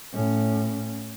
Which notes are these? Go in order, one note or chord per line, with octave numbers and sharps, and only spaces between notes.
A2 C#4